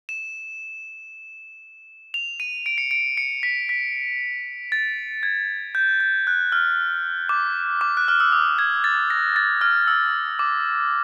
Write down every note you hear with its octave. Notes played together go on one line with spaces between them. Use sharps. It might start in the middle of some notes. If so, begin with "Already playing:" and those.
E7
F7
D#7
D7
C#7
D7
C#7
B6
B6
A6
G#6
G6
G6
F#6
F6
D6
D6
F#6
F6
E6
D#6
G#6
A6
A#6
A6
F6
E6
D6